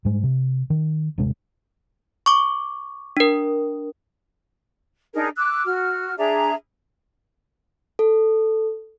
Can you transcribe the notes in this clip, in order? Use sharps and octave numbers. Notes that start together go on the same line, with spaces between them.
G#2 G3 G#3
C3
D#3
D#1 G2 C3 G#3
C#6 D6
D4 A#4
D4 D#4 G#4 A#4
D6 E6 F#6
F#4 F6
D4 G#4 E5 A#5
A4